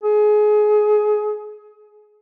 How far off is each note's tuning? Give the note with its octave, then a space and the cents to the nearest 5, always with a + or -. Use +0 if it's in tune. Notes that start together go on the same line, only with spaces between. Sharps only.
G#4 +25